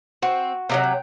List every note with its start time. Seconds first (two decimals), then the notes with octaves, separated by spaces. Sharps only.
0.22 C4 F#4
0.69 C3 F3 F#3 A#4 D#5
0.83 G5